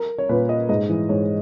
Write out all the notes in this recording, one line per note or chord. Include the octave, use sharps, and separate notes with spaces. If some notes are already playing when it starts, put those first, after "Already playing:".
Already playing: A#4
C#5
A#2 B4
D#5
G#2 D#5
E3
G#2 C#5